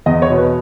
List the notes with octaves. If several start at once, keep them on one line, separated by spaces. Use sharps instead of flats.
E2 D#5
C#5
B2
B4